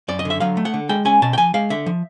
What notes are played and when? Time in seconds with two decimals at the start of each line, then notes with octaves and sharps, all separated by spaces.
0.08 F#2 D5
0.19 D#5
0.25 D3 E5
0.40 F#3 F5
0.57 A3
0.65 F#5
0.74 D3
0.89 G#3 G5
1.05 C#4 G#5
1.22 B2 A5
1.33 G5
1.38 F3 G#5
1.54 G#3 F5
1.70 D3 E5
1.86 F3